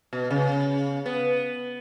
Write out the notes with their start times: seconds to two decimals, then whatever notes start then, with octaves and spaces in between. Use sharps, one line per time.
0.13 B2
0.30 C#3
1.06 B3